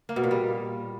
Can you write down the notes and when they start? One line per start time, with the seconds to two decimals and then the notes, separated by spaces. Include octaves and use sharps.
0.09 A#3
0.16 B2
0.24 A#2
0.31 G3